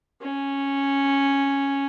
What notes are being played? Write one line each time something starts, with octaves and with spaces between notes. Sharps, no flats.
C#4